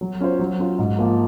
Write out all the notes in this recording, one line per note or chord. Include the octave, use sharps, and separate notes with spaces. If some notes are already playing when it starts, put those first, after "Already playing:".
F#3
C#4 F4 C5
F#3
C#4 F4
G#2
F3 A#3 F4